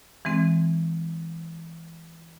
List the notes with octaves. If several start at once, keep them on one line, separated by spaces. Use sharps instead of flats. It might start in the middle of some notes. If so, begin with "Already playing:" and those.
E3 G#3 C4